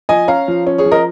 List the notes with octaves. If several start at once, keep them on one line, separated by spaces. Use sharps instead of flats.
F3 D#5 G#5
C#4 F5 A#5
F3
C#4
G#4 C#5
F3
A#4 D#5